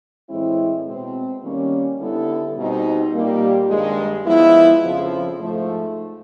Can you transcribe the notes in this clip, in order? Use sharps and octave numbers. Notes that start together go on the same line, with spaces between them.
A2 E3 G#3 C4 E4
B2 G#3 C4
D#3 G3 A#3 C#4
D3 G3 B3 E4 A4
B2 G3 C4 D#4
A#2 G3 A#3 D#4 G4
G2 D#3 G#3
F3 G#3 B3 E4
F2 C#3 F3
G#2 F3 A3